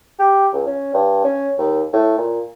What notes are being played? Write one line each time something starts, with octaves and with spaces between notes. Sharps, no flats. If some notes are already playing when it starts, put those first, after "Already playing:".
G4
C#2
C#4
G2
C#4
D#2
A2
A#2